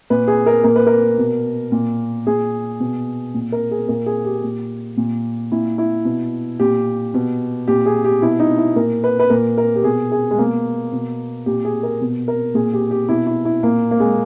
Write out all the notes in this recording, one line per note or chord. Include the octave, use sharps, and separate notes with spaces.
A#2 B4
G#4
A#4
A#2 A#4
B4
A#4
B2
A#2
A#2 G#4
B2
A#2
A#4
G#4
A#2 A#4
G#4
G4
A#2
A#2
A#2 E4
E4
B2
A#2 G4
B2
A#2 G4
G#4
G4
B2 E4
D#4
E4
A#2 A#4
B4
B4
A#2 A#4
A#4
G4
B2 G#4
G#4
G#3
B2 A#3
B2
A#2 G4
G#4
A#4
B2
A#4
A#2 G#4
G4
G4
B2 E4
E4
E4
A#2 A#3
A#3
G#3